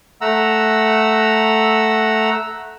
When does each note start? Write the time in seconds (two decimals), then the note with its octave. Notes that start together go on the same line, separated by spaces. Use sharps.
0.21 A3 F#5 A#5 E6